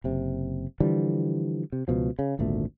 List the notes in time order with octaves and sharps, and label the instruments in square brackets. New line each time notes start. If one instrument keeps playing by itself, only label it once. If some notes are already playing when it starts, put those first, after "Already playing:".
[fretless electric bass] F#1 C3
D3 E3 F3 G3
C3
C#2 B2 F3
C#3
G#1 D2 A#2 A3